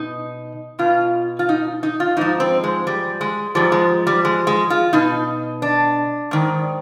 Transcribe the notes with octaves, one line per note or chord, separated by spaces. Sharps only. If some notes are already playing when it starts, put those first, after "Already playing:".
Already playing: B2 D#4
B2 F4
F4
D#4
D#4
F4
G#2 F3 D#4
C4
G#3
G3
G#3
G#2 F3 G3
G#3
G3
G#3
G#3
F4
B2 D#4
D4
G#2 D#3